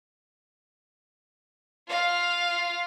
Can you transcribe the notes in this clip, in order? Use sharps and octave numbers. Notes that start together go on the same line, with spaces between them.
F4 F5